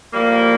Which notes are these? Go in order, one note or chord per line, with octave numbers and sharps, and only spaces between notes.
A2 F3 G3 A#3